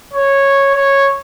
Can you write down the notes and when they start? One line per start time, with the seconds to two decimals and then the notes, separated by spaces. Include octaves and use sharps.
0.13 C#5
0.74 C#5